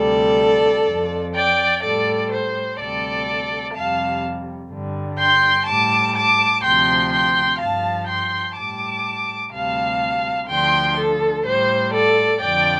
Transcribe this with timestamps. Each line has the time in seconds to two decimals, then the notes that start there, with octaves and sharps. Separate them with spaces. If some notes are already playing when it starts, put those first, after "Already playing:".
Already playing: D2 C3 G3 A4 D5
0.86 F2 F3
1.34 D5 G5
1.82 A2 G3 A4 D5
2.30 C5
2.79 D2 C3 G3 A4 D5
3.74 F2 C3 G3 F5 A5
4.71 G2 D3 G3
5.19 G5 C6
5.67 A2 G3 A5 D6
6.16 A5 D6
6.63 D2 C3 F3 G5 C6
7.12 G5 C6
7.59 G2 F3 F5 A5
8.08 G5 C6
8.56 A2 G3 A5 D6
9.52 D2 C3 G3 F5 A5
10.49 D2 D3 F3 G5 C6
10.98 A4
11.45 A2 G3 C5
11.93 A4 D5
12.41 F2 D3 F3 D5 G5